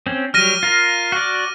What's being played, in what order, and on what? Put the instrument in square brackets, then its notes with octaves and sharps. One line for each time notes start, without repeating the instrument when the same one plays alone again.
[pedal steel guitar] C4 C#4
[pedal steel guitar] F#3 G3 [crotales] F6 A#6 D#7
[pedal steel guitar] F4 A#4
F#4 D5